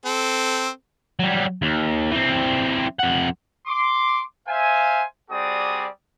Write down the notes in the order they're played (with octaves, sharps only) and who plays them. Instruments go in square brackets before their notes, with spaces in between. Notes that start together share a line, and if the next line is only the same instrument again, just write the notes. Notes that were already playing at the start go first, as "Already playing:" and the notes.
[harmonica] C4 A4
[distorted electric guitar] F#3 G3
D#2
E3 C4
F2 F#5
[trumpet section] C6 D6
C5 E5 F5 G#5
G3 C4 F#4 G#4 D5 D#6